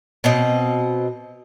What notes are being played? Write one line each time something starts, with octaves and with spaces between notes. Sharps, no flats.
B2 C4 D#5